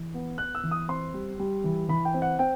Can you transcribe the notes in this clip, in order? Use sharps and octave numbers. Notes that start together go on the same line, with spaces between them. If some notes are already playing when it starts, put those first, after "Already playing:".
Already playing: E3
B3
B3 F#6
E6
E3
D#6
C4 C6
G3
G3
E3
E3 B5
G5
C4
F#5
C4 G5